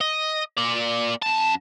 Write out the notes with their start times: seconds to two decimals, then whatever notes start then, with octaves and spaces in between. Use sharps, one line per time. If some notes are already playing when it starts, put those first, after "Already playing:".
0.01 D#5
0.58 A#3 D5
1.22 F#2 A5